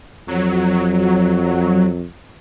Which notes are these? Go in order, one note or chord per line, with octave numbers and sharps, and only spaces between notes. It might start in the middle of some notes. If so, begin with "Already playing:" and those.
F2 F#3